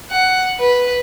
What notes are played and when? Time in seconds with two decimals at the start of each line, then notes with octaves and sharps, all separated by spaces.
0.10 F#5
0.58 B4